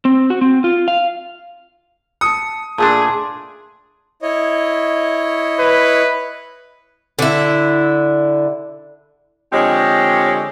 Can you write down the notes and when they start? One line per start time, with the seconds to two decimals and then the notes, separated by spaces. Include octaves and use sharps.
0.05 C4
0.30 F#4
0.41 C4
0.64 F4
0.88 F5
2.21 A5 D#6 C#7
2.78 A#2 A3 D4 G#4 A5 C6
4.22 E4 C#5 D#5
5.59 B4
7.19 D3 E4
9.53 D3 F3 G#3 C4 G4 C#5